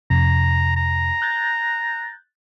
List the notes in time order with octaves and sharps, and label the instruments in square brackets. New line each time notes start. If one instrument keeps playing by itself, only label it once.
[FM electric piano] F2 C3 [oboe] A#5
[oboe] A#5
[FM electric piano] F#6 G6 A6